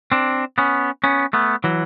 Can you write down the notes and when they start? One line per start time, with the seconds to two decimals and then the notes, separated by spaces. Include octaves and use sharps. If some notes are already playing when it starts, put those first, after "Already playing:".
0.12 C4 D4
0.58 B3 C#4
1.04 B3 C#4
1.33 A3 B3
1.64 E3 F#3